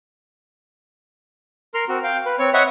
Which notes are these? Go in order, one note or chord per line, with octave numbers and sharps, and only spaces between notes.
A#4 C6 F6
C4 F#4
F5 G5
B4
C4 C#5
C#5 D#5 E5 F#5 B5 C#6